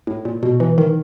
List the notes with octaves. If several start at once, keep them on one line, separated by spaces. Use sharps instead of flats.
A2
A#2
B2
E3
D#3